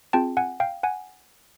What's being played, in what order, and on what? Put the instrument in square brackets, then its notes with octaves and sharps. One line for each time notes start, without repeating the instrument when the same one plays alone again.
[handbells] C4 F4 G#4 G5 A5
F#5 G#5
F5 G5
F#5 G#5